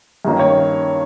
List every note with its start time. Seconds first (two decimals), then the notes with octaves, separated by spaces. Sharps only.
0.25 G2 D#3 A#3 C#4
0.39 C#5